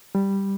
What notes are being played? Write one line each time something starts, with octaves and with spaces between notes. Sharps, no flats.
G3